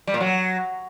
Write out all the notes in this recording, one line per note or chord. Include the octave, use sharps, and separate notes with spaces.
G3
A#2
F#3